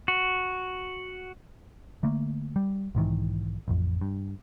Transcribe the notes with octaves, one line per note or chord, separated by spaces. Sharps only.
F#4
D3 A3 A#3
G3
B1 G#2 D#3 E3
A1 F2
G2